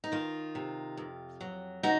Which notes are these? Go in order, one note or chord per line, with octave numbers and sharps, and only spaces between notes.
D#4
D#3 F4
C3
F2
F#3
C#3 D#4 F#4